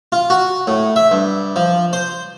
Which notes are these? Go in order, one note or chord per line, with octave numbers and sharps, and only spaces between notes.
F4
F#4
A2
E5
G2
F3
C5